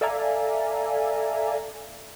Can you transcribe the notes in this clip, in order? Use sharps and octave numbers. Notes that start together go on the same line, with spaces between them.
A4 D5 E5 F5 G#5 A#5